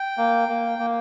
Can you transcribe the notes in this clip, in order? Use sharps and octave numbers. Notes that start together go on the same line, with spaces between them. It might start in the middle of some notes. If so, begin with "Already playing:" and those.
Already playing: G5
A#3
A#3
A#3